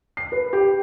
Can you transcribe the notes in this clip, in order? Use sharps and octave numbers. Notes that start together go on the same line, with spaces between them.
C7
B4
G4